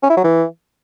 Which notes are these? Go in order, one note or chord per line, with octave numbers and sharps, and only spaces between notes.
C#4
E4
F#3
E3